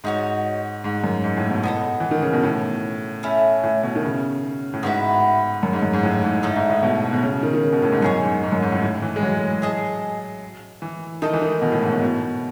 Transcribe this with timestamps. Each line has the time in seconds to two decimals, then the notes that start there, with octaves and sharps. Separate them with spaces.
0.04 G#2 D#4 F#4 C#5
0.84 G#2
1.04 F#2
1.24 G#2
1.37 A2
1.50 B2
1.63 B3 D#4 A4 D#5
2.00 E3
2.11 D#3
2.22 C#3
2.33 B2
2.43 A2
3.23 A3 C#4 E4
3.63 A2
3.83 B2
3.96 D#3
4.04 C#3
4.74 A2
4.83 G#2 B3 F#4 B4 E5
5.63 F#2
5.73 G#2
5.83 F#2
5.93 G#2
6.03 A2
6.23 G#2
6.43 G#2 A3 D#4 A4 D#5
6.56 G#2
6.69 A2
6.83 B2
7.13 B2
7.23 C#3
7.43 D#3
7.54 D#3
7.62 C#3
7.72 B2
7.82 A2
7.92 G#2
8.02 F#2 D#4 G#4 C#5
8.23 G#2
8.43 G#2
8.52 F#2
8.62 G#2
8.72 A2
8.82 A2
9.02 E3
9.16 G#3
9.23 F#3
9.62 G#4 D#5 A5
10.82 E3
11.22 D#3 D#4 A4 D#5
11.33 E3
11.42 D#3
11.62 B2
11.72 A2
11.82 G#2
11.92 A2
12.02 B2
12.22 B2